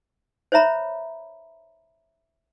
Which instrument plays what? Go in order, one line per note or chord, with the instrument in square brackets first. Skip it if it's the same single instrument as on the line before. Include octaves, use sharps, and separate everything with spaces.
[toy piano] C5 C#5 E5 A#5 B5